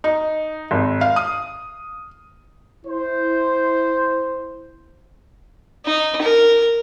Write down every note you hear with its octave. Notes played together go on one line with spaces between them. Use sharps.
D#4
G#1
F5
D#6
E4 C5
D#4
A#4